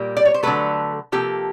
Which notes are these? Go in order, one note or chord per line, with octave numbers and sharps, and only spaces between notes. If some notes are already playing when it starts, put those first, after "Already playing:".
Already playing: A#2 G3 A#3
D5
C#5
C5
D3 F#3 A3 A4 B4
C3 F3 A#3 G4 A4